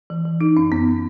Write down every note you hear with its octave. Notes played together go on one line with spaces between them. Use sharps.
E3
E3
E3 D#4
F#2 C#4
F#2 B3